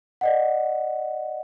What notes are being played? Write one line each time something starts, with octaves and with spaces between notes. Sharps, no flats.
D5 D#5 F#5